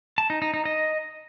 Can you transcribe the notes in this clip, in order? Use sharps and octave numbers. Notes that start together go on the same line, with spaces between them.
A5
D#4
D#4
D#4
D#5